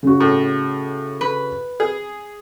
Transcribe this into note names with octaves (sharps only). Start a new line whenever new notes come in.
C#3 F#4
A2
B4
G#4